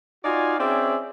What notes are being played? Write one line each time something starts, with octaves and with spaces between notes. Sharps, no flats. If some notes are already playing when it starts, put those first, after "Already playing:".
D#4 F4 F#4 D5 F5 G#5
C4 C#4 G#4 D5 E5 G5